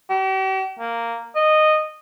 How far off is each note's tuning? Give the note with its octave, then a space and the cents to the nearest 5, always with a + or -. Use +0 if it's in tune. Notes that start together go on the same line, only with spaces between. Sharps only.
G4 -45
A#3 -5
D#5 -10